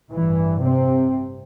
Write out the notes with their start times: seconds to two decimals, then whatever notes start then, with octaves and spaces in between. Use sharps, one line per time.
0.12 A1 G2 E3
0.62 C3 C4